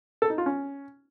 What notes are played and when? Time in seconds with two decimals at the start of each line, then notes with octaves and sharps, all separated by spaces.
0.22 A4
0.30 D#4
0.38 F4
0.46 C#4